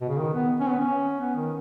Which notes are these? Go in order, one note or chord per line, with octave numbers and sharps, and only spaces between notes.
B2
C#3
D#3
B3
C#4
B3
C#4
B3
D#3